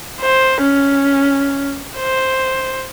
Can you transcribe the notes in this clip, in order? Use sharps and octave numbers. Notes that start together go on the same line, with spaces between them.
C5
C#4
C5